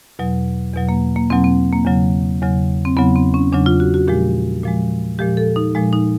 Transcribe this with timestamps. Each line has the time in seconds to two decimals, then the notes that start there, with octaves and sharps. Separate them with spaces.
0.19 E2 B2 F#3
0.74 E2 B2 F#3
0.89 A#3
1.16 A#3
1.30 E2 B2 F#3 C4
1.44 C4
1.72 A#3
1.86 E2 C#3 F#3
2.42 E2 C#3 F#3
2.85 C4
2.97 E2 C#3 F#3 B3
3.16 C4
3.34 C#4
3.52 E2 C#3 F#3 D4
3.66 F4
3.80 F#4
3.94 F#4
4.08 A#2 F3 G#3 G4
4.64 A#2 F3 G#3
5.19 A#2 F3 G#3 G4
5.37 A4
5.56 D#4
5.75 A#2 F3 G#3
5.93 D#4